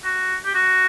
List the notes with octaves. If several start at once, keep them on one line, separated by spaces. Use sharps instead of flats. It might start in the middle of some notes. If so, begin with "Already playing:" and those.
F#4
G4
F#4